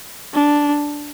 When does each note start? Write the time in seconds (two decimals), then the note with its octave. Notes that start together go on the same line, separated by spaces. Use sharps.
0.33 D4